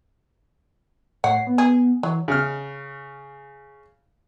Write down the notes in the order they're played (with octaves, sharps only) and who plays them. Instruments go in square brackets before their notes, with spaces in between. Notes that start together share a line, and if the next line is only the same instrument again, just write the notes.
[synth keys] A2 C#5 C7 [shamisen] F#5
[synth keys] B3
[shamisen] G#4
[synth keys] E3 [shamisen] F#3
[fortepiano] C#3 F6